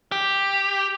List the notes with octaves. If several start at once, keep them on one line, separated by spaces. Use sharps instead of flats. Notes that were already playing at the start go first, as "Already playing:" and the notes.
G4